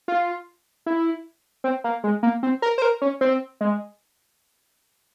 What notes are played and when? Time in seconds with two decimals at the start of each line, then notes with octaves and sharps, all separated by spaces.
0.08 F4
0.86 E4
1.64 C4
1.84 A#3
2.04 G#3
2.23 A#3
2.43 C4
2.62 A#4
2.78 C5
2.82 A#4
3.02 C#4
3.21 C4
3.61 G#3